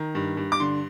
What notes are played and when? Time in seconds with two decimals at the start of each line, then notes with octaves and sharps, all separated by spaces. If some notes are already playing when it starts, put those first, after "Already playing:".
Already playing: D#3 A#5
0.15 G2
0.37 G2
0.52 D6
0.60 D3 C6